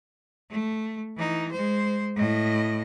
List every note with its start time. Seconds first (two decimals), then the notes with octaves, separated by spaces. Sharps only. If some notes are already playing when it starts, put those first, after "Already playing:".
0.51 A3
1.16 E3 D#4
1.52 G#3 C5
2.16 A2 D#5